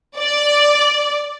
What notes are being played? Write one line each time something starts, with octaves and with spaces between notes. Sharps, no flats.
D5